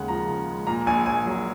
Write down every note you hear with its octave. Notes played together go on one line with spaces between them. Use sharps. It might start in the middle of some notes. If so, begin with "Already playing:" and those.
Already playing: D#2 C#3 G#3 F#5
F3 A#5
C#3
G#3
A#2 A#5
A#1 G#5
A#1 G#5
F#3